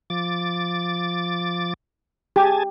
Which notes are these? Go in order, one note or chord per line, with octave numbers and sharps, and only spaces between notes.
F3 D6 A6
G4 G#4 G#5 A5